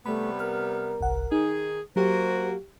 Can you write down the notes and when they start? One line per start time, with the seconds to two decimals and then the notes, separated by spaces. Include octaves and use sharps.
0.06 C3 G3 A3 B3 B5
0.40 A#4 F6
1.01 G1 C2 F#5
1.32 D#3 D#4 G#4
1.96 F#3 A#3 F#4 G4 C5